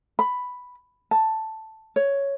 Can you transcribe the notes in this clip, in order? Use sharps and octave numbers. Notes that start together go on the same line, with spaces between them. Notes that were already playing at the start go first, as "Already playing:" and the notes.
B5
A5
C#5